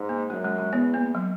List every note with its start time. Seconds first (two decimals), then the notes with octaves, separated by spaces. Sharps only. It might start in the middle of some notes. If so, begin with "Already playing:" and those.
Already playing: G#2
0.09 A#3
0.30 F#2 G#3
0.45 G#3
0.58 G#3
0.73 E2 B3
0.94 A#3
1.15 F#3